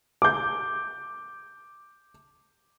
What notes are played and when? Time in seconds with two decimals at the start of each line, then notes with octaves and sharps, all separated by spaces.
0.22 D6 G6